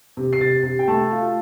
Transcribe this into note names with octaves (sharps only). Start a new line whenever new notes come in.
C3
C7
C3 A6
C3
G5
A3 A5
F4